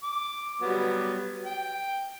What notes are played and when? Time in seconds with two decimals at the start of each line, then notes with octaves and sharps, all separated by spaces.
0.04 D6
0.61 F#3 G3 B3
1.45 G5